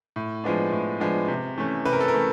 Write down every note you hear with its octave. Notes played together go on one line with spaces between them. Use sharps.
A2
F3 G#3 B3 D4
A2
F3 G#3 B3 D4
C3
E3 A3 C#4
C3 B4
A#4
A4
A#4
E3 A3 C#4